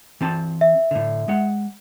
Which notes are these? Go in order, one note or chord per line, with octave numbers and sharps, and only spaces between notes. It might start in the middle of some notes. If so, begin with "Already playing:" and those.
E3 C4 A5
E5
A2 D3
G#3 F#5